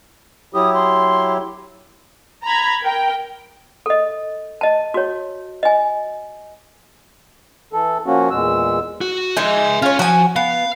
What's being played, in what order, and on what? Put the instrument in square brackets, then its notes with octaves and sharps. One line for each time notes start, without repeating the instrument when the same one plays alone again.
[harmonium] F#3 E4 G4 [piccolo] D#6
[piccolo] C6
[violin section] A#5 B5 G#6
A#4 G5
[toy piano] A4 D#5
D#5 A5
F#4 C#5
D#5 G#5
[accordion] E3 A4
F3 A#3 C#4 F#4
E2 A#2 G#3 E6
[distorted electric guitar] F#4
[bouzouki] G#3 D#4 [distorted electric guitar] E5 G#5
[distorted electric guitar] C#4 [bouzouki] F4 C#5
[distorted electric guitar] F3 [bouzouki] F#4 G#5
[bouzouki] B3 [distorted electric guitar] F5